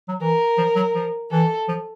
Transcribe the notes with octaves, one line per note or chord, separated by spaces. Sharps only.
F#3
E3 A#4
F3
F#3
F3
E3 A4
F3